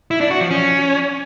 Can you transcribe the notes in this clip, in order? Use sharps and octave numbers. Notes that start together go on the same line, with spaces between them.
E4
D4
F#4
F3
C#4